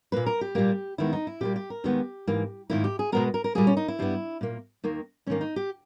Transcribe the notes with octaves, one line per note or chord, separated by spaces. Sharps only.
A#2 A#3 B4
A#4
G4
A#2 G3 A#3
D#2 D#3 G#3 B3 E4
D#4
E4
A#2 G3 A#3 G4
G4
A#4
D#2 D#3 G#3 B3 G4
G#2 E3 A#3
G#2 D#3 A#3 E4
G4
G#4
B2 G#3 B3 A#4
A#4
A#4
A#2 G3 A#3 G#4
C#4
D#4
E4
G2 G3 B3
A#2 A#3
D#2 D#3 A#3
G#2 D#3 A#3 C#4
D#4
G4